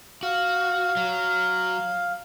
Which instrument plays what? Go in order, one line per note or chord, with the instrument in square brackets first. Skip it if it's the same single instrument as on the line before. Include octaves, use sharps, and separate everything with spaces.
[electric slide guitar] F#4 [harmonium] F5
[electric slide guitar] F#3